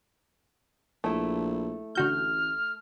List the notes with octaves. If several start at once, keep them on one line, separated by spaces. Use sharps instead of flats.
A#1 A3 E4
A1 D3 F#4 F6 G6